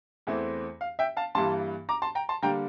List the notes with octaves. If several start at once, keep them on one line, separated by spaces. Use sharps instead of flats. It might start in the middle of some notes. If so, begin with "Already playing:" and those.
E2 E3 A3 C4
F5
E5 G5
F5 A5
G2 E3 G3 A#3 A5 C6
A#5 D6
A5 C6
G5 A#5
A5 C6
D3 G3 A#3 G5 A#5